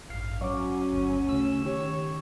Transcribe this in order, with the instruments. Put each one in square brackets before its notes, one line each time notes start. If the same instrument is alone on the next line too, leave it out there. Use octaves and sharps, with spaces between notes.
[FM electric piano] A1 G2 [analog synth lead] F5
[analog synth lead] F#3 [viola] C#4 [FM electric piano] C#6 D6
[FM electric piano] G1 D2
[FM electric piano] C#3 A3 [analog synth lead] E6
[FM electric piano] D#3 G4 [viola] C#5